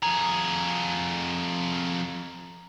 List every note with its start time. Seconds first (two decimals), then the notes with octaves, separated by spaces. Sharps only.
0.03 F2 G#4 A#5